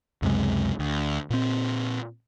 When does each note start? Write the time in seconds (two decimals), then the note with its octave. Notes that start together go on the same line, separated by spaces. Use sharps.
0.22 C#2 F#2 C3 G#3
0.79 D2
1.30 A#2 C4